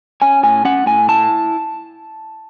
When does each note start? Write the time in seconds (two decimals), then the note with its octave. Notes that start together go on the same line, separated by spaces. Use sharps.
0.22 C#4 G#5
0.43 A2 G#5
0.65 C#4 F#5
0.86 A2 G#5
1.09 E4 A5